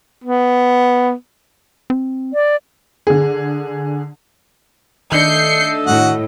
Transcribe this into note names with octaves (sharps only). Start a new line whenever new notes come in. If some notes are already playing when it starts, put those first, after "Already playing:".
B3
C4
D5
D3 G#4
D#3 A3 D4 A4 D#5 G6 C7 C#7
A2 F#4 F#5